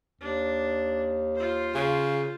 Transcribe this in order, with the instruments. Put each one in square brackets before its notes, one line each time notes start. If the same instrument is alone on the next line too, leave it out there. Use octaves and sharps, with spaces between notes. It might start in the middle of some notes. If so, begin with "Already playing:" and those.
[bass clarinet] D#2 [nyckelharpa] D4
[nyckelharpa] F4 C5
[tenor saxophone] C#3